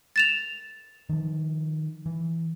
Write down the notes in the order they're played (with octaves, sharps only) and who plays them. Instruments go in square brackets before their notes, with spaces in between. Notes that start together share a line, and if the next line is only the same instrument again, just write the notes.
[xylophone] A6 E7 F7
[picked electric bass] D#3 F3
E3